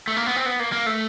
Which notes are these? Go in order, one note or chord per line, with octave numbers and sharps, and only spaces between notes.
A3
A#3
B3
C4
B3
A#3
A#3
A3